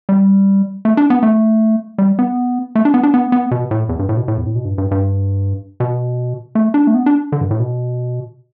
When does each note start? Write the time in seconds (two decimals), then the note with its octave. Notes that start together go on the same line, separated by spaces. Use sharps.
0.09 G3
0.85 A3
0.97 D4
1.10 B3
1.23 A3
1.98 G3
2.19 B3
2.75 A3
2.85 D4
2.94 B3
3.03 D4
3.14 B3
3.32 B3
3.51 B2
3.71 A2
3.89 E2
3.99 G2
4.09 A2
4.17 B2
4.28 A2
4.37 E2
4.46 A2
4.55 B2
4.65 G2
4.78 G2
4.91 G2
5.80 B2
6.55 A3
6.74 D4
6.87 A3
6.94 B3
7.06 D4
7.32 D3
7.41 G2
7.51 A2
7.60 B2